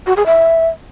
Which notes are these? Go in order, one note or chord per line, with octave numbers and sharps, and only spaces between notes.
F#4
G#4
E5